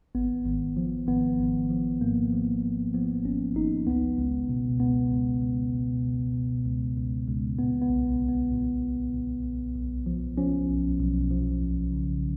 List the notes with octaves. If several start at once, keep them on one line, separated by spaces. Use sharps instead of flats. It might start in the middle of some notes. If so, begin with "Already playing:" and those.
G#1 B3
G#1
F3
G#1 B3
G#1
F3
G#2 A#3
F3
G#1
F3 B3
G#1 C#4
G#1 D#4
C#2 B3
C#2
B2
C#2 B3
C#2
C#2
B2
B2
B2
C#2
C#2
C#2
A#2 B3
B3
B1
A#2
B3
A#2
A#2
A#2
B1
B1
F3
F3 C#4
B1
B1
F3
C#2
C#3